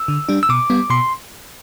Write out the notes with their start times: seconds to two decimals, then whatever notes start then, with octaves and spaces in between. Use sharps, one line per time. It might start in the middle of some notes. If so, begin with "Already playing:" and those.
Already playing: E6
0.08 D3
0.29 G3 D4
0.43 E6
0.49 B2 D6
0.70 G3 B3
0.90 B2 C6